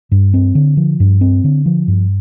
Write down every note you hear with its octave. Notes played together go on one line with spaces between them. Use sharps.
G2
C4
D3
F3
G2
C4
D3
F3
G2